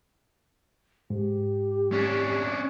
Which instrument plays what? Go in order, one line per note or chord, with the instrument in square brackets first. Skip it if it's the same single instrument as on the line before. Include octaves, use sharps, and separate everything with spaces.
[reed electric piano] G#2 [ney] G4
[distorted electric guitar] C#4 D4